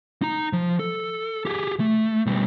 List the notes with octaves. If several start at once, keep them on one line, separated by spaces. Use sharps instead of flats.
D#4 A#5
F3
A4
G4 G#4
A3
B2 G3